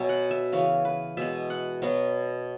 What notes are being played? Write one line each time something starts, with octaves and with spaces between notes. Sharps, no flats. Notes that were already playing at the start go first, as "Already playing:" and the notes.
Already playing: B2 F#3 B3 E5 G#5
F#5
E5
C#3 E3 B3 C#5
B4
B2 G#3 B3 E5
F#5
B2 F#3 B3